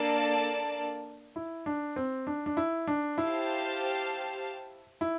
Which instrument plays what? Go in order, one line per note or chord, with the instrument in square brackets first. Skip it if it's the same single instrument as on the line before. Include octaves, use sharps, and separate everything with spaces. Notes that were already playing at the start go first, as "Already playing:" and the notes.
Already playing: [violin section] A#3 D4 A4 D5 A5
[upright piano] E4
D4
C4
D4
D4
E4
D4
[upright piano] E4 [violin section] G4 C5 F5 A5
[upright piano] E4